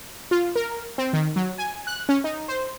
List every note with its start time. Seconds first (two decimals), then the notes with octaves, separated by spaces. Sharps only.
0.31 F4
0.56 A#4
0.98 C4
1.13 D#3
1.36 F#3
1.58 G#5
1.87 F#6
2.09 C#4
2.24 D#4
2.48 C5